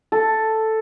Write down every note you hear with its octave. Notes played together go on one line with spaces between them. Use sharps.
A4